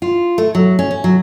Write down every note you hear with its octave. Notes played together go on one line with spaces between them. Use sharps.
F4
A3
F#3
C#4
C#4
F#3